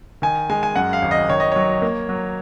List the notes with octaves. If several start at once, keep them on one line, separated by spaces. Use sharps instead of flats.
D#3 G#5
G#3 G#5
G#5
F#2 F#5
F5
G#1
D#5
D#3 C#5
D#5
F#3 C#5
A#3
F#3